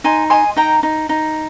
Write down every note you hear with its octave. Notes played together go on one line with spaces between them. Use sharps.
D#4 G#5 C6
D#5 G#5 C6
D#4 G5 A#5
D#4
D#4